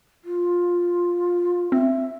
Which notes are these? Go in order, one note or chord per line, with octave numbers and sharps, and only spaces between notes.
F4
C4 E5